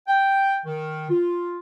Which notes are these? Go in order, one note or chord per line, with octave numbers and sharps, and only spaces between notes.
G5
D#3
F4